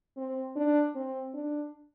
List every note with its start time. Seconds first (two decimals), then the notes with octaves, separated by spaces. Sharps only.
0.17 C4
0.56 D4
0.95 C4
1.34 D4